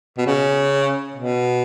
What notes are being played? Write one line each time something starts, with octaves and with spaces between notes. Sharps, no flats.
B2
C#3
B2